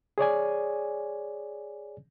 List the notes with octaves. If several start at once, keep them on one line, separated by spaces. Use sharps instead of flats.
G#4 C#5 D5 G#5